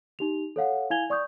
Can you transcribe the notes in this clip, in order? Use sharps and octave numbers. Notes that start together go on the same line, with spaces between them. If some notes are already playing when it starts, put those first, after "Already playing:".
D#4 G4 F7
A4 C#5 F5 F#5
E4 F5 G#5 G#6 F7 G7
D5 C#6 D#6 G6